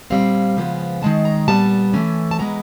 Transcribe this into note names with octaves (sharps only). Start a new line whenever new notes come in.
A#2 G3 C4 F5
C#3 F3 G#3 B3
D#3 G#3 C#4 A5
A#5
A#2 G3 B3 A5
E3 A3 C#4
A5
E3 G#3 B3 A#5